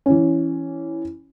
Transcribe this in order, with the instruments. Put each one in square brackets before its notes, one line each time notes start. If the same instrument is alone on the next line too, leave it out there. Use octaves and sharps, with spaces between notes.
[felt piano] E3 C#4